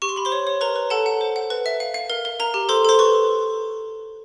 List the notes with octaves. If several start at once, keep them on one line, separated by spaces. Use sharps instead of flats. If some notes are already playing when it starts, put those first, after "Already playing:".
G4 C#6
C6
G4 B5
C5 C6
C#5
C#5
A#4 B4 A#5
B4
A4 F#5 A5
F#5
C5
F#5
B4
E5
F5
F5
A#4
A#4
A#4 A#5
G4
A4 C5 C6
A4 C5 C6
B4 C#6